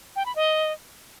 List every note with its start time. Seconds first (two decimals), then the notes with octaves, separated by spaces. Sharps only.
0.16 G5
0.26 B5
0.36 D#5